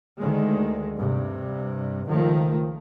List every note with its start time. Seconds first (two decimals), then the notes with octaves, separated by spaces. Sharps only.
0.21 D2 D#3 G#3
0.98 G2 C3
2.08 C#2 D#3 F3 A3